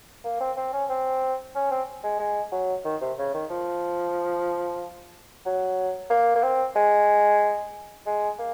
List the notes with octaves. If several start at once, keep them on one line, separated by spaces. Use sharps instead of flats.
A#3
C4
C4
C#4
C4
C#4
C4
G#3
G#3
F#3
D#3
C3
C#3
D#3
F3
F#3
A#3
A#3
C4
G#3
G#3
A#3